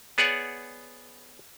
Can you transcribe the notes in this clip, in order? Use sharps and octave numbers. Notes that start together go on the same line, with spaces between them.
B3 G#4 C#5 D5 F#5